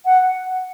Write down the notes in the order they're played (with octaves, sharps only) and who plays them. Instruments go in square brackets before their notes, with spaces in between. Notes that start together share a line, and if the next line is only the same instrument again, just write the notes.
[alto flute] F#5